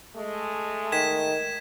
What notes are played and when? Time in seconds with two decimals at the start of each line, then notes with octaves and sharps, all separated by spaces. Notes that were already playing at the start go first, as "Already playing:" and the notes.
0.17 G#3 A3
0.92 D#3 G#6 B6 E7